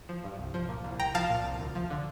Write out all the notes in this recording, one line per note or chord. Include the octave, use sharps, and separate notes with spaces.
F3
G2
C2
F3
A#2
C2
C2 G5 A#5
F3 F5 A5
A#2
C2
D2
F3
D3